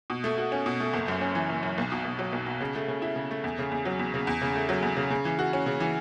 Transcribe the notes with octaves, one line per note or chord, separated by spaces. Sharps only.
B2
A3
F#4
C#4
B2
A3
F#1
F#2
C#4
E3
F#1
F#2
B1
B2
B1
F#3
B1
B2
C#3
A3
C#3
E4
C#3
A3
E2
C#3
E2
F#3
E2
C#3
E2
C#3
A3
F#3
E2
C#3
C#3
E3
F#4
C#4
C#3
E3